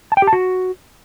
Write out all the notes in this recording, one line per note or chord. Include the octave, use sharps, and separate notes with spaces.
A5
G5
G4
A5
F#4